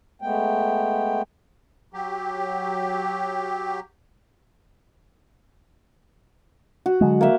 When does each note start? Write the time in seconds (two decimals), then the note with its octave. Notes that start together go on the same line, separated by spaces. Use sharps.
0.22 G#3 A3 B3 G5
1.93 F#3 G4
6.86 F#4
7.01 D3 F#3 G#3
7.21 A#3 E5